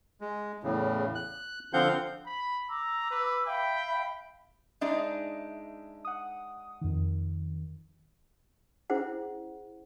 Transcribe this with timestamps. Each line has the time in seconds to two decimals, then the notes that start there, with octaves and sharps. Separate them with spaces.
0.21 G#3
0.64 E2 A2 C#3
1.15 F#6
1.73 D3 F3 C4 F5 F#5 G6
2.25 B5
2.69 A#5 D6 E6
3.11 B4
3.47 E5 F5 G5 B5
4.81 G#3 D4 D#4 E5
6.05 F#5 D#6
6.81 F2 D#3
8.90 C#4 E4 G#4 C5 F#5